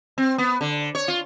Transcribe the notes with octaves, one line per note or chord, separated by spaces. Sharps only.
C4
B3
D3
C#5
F4